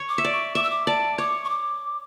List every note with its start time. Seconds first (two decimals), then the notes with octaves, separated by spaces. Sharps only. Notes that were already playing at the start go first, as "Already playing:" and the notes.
Already playing: C#5
0.09 D6
0.18 E5
0.24 D5
0.33 C#6
0.55 E5 D6
0.63 E6
0.70 D6
0.87 D5 A5
1.18 C#5 D6
1.44 C#6
1.49 D6